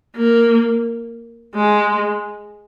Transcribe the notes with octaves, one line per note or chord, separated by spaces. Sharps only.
A#3
G#3